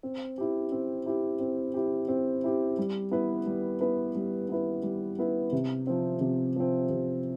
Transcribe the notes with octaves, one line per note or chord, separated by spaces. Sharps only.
C4
E4 G4
C4
E4 G4
C4
E4 G4
C4
E4 G4
G3
B3 E4 B4
G3
B3 E4 B4
G3
B3 E4 B4
G3
B3 E4 B4
C3
F3 C4
C3
F3 C4
C3